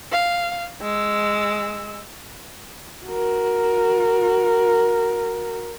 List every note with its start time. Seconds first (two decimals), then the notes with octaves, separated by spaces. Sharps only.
0.12 F5
0.82 G#3 E6
3.06 F#4 A#4